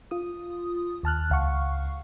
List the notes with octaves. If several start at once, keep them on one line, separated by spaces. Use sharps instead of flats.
F4 D#6
D#2 A5 F6 F#6
C#2 F5 F#5 C#6